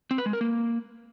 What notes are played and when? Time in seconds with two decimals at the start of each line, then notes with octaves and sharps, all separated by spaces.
0.11 C4
0.18 B4
0.26 G#3
0.33 A#4
0.41 A#3